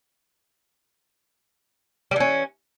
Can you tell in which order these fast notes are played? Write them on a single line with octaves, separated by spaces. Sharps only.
G3 E3 C#4